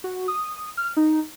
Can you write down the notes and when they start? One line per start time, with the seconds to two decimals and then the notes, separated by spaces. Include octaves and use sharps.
0.04 F#4
0.28 D#6
0.77 F6
0.97 D#4